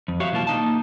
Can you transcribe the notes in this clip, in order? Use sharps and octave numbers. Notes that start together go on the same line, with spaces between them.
F2
F#4 G4 C5 C#5 E5 F5
B1 E3 A#3 F4 A5
A#3 D#4 A5